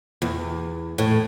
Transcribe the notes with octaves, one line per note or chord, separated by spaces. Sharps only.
E2
A2